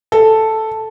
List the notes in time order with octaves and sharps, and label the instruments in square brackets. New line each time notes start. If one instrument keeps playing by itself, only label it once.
[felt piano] A4